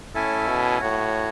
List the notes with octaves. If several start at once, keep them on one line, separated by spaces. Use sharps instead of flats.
A2 C#4 E4 A4 E5 G#5
B2
A2 F#4 C#5 F#5